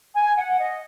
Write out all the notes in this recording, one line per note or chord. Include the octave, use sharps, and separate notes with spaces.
G#5
F#5
D#5